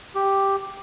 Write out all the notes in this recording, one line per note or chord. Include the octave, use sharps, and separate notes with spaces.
G4